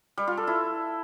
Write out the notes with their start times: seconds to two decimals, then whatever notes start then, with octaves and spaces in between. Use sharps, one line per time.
0.17 G3
0.27 F4
0.37 A4
0.47 E4